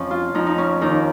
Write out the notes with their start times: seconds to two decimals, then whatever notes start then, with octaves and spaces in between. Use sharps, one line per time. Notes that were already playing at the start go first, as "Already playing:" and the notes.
Already playing: F2 F3 C#4
0.11 F4
0.35 F2 D#4
0.46 D#4
0.58 C#4
0.81 D#2 D#4